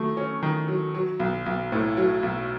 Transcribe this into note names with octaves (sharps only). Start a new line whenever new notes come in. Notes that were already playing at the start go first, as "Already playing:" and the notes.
Already playing: D#3 F#3 A3
C#4
D#3
F#3
F#3
B1
B1
A2
F#3
B1